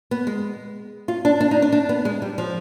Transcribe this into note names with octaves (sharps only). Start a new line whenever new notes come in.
B3
G#3
F4
D4
D4
D#4
D4
D4
B3
G#3
G3
F3